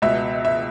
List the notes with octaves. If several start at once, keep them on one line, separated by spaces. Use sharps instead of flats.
C#2 B2 E5
E5